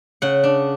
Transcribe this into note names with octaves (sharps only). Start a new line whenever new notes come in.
C#3 F#5
D4